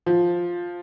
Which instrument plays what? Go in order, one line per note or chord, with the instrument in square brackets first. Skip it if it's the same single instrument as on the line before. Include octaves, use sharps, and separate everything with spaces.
[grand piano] F3